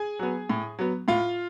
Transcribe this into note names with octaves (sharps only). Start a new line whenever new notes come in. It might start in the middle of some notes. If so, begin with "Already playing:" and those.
Already playing: G#4 G#5
F#3 B3
A2
F#3 B3
A2 F4 F5